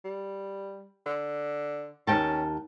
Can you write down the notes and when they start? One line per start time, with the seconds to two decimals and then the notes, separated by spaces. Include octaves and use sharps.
0.05 G3
1.06 D3
2.07 D#2 C#4 G5 A5